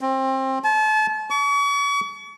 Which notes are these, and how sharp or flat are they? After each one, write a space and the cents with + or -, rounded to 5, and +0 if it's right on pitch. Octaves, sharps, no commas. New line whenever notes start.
C4 +25
A5 -35
C#6 +40